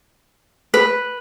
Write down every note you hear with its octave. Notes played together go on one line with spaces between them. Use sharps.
B4